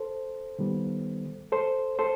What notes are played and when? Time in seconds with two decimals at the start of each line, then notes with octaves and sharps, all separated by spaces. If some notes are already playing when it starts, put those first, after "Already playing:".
Already playing: A4 C5
0.59 D#3 G3 B3
1.52 A4 C5
1.99 A4 C5